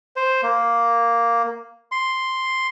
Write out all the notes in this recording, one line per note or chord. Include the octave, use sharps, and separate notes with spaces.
C5
A#3
C6